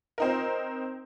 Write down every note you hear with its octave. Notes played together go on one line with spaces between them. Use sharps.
C4 D#4 A#4